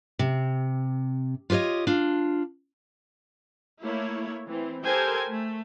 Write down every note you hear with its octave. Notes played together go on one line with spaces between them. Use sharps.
C3
F4 G4 B4 C#5 D#5
D4 F4
A3 A#3 E4 C#5
E3 C4
G4 A4 A#4 C5 G5 G#5
A3